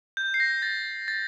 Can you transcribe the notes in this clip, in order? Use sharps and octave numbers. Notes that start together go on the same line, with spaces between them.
G6
C7
A#6
A6
A6